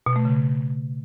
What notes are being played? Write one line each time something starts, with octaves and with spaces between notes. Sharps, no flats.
B2
A3
C#3